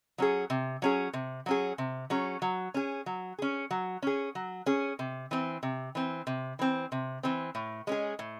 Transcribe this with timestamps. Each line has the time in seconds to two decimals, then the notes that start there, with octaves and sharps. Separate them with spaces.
0.18 F#3 C#4 G#4
0.50 C3
0.82 F#3 C#4 G#4
1.13 C3
1.46 F#3 C#4 G#4
1.78 C3
2.10 F#3 C#4 G#4
2.42 F#3
2.74 C#4 G#4
3.06 F#3
3.38 C#4 G#4
3.71 F#3
4.02 C#4 G#4
4.35 F#3
4.66 C#4 G#4
4.99 C3
5.31 E3 C4
5.63 C3
5.95 E3 C4
6.27 C3
6.59 E3 C4
6.92 C3
7.23 E3 C4
7.55 A2
7.87 G#3 C#4 G#4
8.19 A2